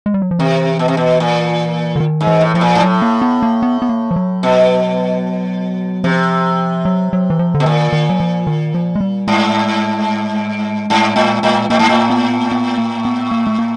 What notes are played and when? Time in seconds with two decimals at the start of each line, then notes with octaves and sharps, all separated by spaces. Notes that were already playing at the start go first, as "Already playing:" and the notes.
0.06 G#3
0.14 G3
0.22 F#3
0.31 F3
0.39 C3 E3
0.79 B2
0.88 C3
0.97 B2
1.20 A#2
1.96 D3
2.00 D#3
2.21 G#2
2.27 E3
2.41 A2
2.54 A2 F3
2.61 A#2
2.75 G#2
2.82 A2 F#3
3.02 A#3
3.22 B3
3.43 A#3
3.63 B3
3.82 B3
3.89 A#3
4.11 F3
4.16 F#3
4.43 B2
6.04 C3 F3
6.85 F#3
7.13 F#3
7.30 E3
7.39 F3
7.54 D3
7.60 B2
7.66 A#2 D#3
7.93 D#3
8.09 F#3
8.20 F3
8.47 D#3
8.75 F3
8.95 G#3
9.01 G3
9.28 G#2 G#3
10.90 G#2
11.16 A2
11.43 A2
11.70 A2 A#3
11.79 G#2
11.89 A2
12.10 B3
12.52 B3
12.78 A#3
13.05 B3
13.31 A#3
13.47 A3
13.59 A#3